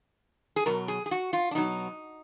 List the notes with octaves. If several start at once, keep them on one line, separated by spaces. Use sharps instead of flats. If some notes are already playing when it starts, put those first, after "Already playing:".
G#4
B2 F#3 A#4
G#4
G#4
F#4
F4
D4
B2 F#3 D#4